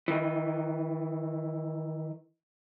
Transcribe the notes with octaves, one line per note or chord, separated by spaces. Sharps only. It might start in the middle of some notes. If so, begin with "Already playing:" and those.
D#3 E3